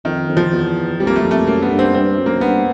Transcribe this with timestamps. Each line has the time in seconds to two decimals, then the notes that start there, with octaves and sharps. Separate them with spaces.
0.05 F2 D#3
0.28 F2
0.36 E2 F3
0.52 E2
1.00 F2 G3
1.07 A#3
1.16 A3
1.23 F2
1.31 A3
1.47 F#2 A#3
1.62 F#2 B3
1.70 G2
1.79 C4
1.94 G2 C4
2.18 F#2
2.26 A#3
2.41 G2 B3